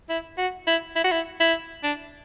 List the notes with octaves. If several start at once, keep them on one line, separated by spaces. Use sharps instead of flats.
E4
F#4
E4
E4
F#4
E4
E4
D4